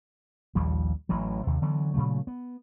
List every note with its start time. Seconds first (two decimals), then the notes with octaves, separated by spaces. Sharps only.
0.55 A#1 D#2 F3 G3
1.09 A1 A2 E3 F#3
1.47 D#2 C3
1.62 D3 E3 F#3 B3
1.94 A#2 C#3 F#3 A3
2.27 B3